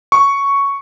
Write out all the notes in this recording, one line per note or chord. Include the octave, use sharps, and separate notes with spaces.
C#6